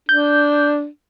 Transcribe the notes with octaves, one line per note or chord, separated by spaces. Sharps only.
D4 G6